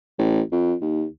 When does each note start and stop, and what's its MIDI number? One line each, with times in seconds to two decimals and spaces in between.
0.19 0.41 33
0.52 0.74 41
0.81 1.04 39